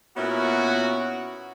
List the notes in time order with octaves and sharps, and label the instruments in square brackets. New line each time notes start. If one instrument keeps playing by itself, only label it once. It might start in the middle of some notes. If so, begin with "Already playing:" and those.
[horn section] A#2 B3 C#4 E4 F#4